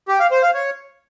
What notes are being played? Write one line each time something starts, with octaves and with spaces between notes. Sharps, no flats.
G4
F5
C5
F5
C#5